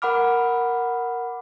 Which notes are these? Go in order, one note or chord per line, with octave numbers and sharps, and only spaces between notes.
A#4 F#5 B5 D6 F6